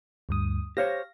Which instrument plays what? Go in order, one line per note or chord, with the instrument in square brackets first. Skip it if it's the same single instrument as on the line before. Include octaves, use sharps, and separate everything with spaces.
[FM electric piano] D2 G2 D#6
[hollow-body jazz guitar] G4 C5 C#5 [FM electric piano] F5 A#6